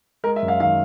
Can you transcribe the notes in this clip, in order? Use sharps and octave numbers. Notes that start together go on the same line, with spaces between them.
G#3 A#4
E5
F#2
F5
D#3 F5